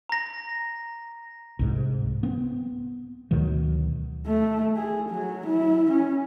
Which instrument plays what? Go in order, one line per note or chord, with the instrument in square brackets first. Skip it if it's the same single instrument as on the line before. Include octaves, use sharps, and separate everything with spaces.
[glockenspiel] A#5 A#6
[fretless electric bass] C2 G#2
B3 C4
D2 B2 D#3 F#3
[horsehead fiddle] A3
G#4
F#3
E4
C#4